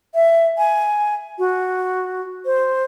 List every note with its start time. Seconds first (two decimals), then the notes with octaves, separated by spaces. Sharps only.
0.15 E5
0.58 G#5
1.39 F#4
2.46 C5